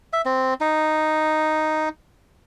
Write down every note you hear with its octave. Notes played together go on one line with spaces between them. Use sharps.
E5
C4
D#4